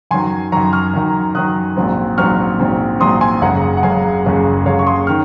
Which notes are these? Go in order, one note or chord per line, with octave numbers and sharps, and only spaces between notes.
F#2 D#3 F#3 G#5 C6
F#2 D#3 F#3 A#5 C#6
C#6 F6
F#2 D#3 F#3
F#2 D#3 F#3 D#6 F#6
A#1 G#2 F#3 C4
A#1 G#2 F#3 C4 C#6 F6
A#1 G#2 F#3 C4
A#1 G#2 F#3 C4 C6 D#6
G#5 C6
F#1 F#2 C#3 G#3 F#5 A#5
F#5
F#1 F#2 C#3 G#3 F5 G#5
F#1 F#2 C#3 G#3
F#1 F#2 C#3 G#3 C#5 F5
C#6
C6 D#6
D#3 C#6 F6